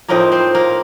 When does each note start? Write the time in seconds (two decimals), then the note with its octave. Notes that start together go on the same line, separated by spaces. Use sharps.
0.08 A2 F3 A#3 C4 D#4 A#4
0.32 C4 C5
0.55 A#3 A#4